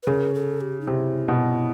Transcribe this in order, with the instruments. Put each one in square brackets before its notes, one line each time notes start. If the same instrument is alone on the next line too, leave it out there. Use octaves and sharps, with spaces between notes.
[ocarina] B4
[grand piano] C#3 [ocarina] A#4
[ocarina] A4
G4
D#4
[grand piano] C3 [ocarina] E4
[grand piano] B2